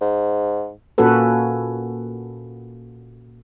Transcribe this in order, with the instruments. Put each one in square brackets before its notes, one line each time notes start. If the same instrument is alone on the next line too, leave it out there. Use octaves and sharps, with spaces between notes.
[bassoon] G#2
[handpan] A#2 A#3 C#4 F#4 A4 B4